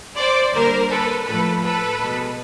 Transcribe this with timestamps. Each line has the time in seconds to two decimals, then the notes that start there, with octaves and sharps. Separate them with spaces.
0.18 C5 D5
0.54 D3 G3 A#3 A#4 C5
0.90 A4 B4
1.26 A2 F3 A3 A4 B4
1.63 A4 B4
1.99 B2 G#3